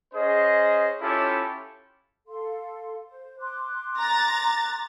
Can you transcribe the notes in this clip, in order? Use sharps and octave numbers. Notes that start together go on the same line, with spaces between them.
C#4 G#4 C5 D#5
C#4 E4 F4 G4 A4
A4 F5 C6
C5
C6 D6 F#6
A#5 A6